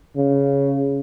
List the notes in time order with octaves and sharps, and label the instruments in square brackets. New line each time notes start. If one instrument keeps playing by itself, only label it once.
[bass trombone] C#3